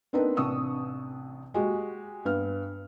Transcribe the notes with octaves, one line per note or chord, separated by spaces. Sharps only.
B3 C4 D4 D#4 A#4 B4
A1 C3 D4 C#6 D#6 E6
G#3 F#4 G4
G2 B3 F6